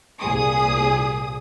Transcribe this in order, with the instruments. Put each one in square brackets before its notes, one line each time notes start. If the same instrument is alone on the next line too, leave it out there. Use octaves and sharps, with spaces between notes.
[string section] C2 A#2 G#4 D#6